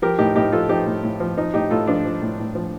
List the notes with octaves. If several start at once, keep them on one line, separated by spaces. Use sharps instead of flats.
F3 G4 A#4
A2 D#4 G4
A2 D#4 G4
F3 F4 A4
F3 D#4 G4
A2
A2
F3
F3 D#4
A2 D#4 G4
A2 F4 A4
F3 D4 F4
F3
A2
A2
F3